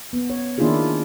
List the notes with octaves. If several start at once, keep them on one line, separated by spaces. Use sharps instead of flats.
B3
C#5
D#3 A#3 D4 E4 F4 G#4